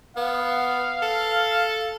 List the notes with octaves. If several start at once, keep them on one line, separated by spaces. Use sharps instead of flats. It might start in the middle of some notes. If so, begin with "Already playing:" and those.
B3 F5
A4